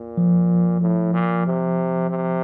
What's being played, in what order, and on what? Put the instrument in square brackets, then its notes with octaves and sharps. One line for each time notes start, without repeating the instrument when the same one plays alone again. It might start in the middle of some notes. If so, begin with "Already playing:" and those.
Already playing: [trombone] A#2
[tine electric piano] F3
[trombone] A2
A#2
C3
C3